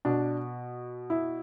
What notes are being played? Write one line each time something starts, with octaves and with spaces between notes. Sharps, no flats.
B2 D4
E4